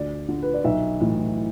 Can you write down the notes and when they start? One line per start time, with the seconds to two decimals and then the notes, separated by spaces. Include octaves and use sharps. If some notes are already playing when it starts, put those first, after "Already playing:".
Already playing: D2 D5
0.28 D3
0.42 B4
0.54 D5
0.64 B1 E5
1.00 A2 E3